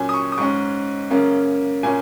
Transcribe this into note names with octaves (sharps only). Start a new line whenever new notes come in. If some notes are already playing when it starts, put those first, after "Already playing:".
Already playing: A#2 F#3 C#4 G#5
D#6
C#6
D#6
G#2 G#3 C#4 C#6
F#2 C#3 A#3 C#4
A#2 A#3 C#4 G#5